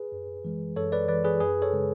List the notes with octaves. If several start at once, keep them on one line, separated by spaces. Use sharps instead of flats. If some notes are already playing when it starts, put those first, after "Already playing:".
Already playing: G#4 B4
F#2
E3 G#3
F#2 A4 C#5
B4 D5
E3 G#3 B4 D5
G#4 B4
F#2 G#4 B4
A4 C#5
C#3 G#3